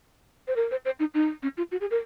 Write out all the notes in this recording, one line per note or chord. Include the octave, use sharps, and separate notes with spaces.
C5
A#4
C5
C5
D#4
D#4
C#4
F4
F#4
G#4
A#4